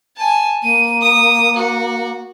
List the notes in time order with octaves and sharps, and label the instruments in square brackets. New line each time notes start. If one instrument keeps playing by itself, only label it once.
[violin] G#5 A5
[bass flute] A#3 [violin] D#7
[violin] D#6
F#4